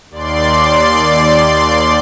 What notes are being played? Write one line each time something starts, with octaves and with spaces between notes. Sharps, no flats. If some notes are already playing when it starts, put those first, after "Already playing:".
D#2 D5 C6